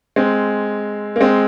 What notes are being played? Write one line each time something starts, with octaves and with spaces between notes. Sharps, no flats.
G#3 C4
A#3
G#3 C4